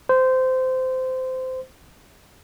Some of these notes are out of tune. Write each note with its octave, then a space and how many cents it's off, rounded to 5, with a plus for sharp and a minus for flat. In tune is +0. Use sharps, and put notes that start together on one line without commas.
C5 -20